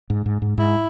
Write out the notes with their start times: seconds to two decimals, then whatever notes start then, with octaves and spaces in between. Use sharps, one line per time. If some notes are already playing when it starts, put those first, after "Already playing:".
0.10 G#2
0.26 G#2
0.42 G#2
0.58 G#2 E4